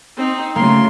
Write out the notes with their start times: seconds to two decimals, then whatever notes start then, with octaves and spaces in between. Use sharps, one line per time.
0.17 C4 D#4
0.56 C#3 F#3 A3 A#3 C6